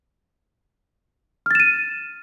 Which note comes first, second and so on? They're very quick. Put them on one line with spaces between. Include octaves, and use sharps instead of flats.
F6 A6 E7 D#7